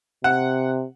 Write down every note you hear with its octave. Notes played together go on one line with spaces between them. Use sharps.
C3 F#5